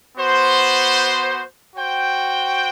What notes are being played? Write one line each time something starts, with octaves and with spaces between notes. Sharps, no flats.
B3 F#4 C5
F#4 C5 G5